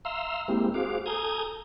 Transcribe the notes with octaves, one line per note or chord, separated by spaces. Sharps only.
E5 F5 A#5 C6 E6
G#3 A#3 C4 E4 G4
F#4 G#4 C5 F5 D6
A4 G#5 A#5 D#6 G6 G#6